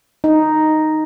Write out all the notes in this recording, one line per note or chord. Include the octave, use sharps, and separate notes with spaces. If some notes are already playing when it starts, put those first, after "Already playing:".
D#4